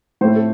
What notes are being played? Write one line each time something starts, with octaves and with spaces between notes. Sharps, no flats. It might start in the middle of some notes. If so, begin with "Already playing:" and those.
A2 A3 C5
A4